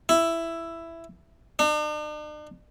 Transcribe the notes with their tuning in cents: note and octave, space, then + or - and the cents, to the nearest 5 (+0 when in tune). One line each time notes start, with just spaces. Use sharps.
E4 +10
D4 +45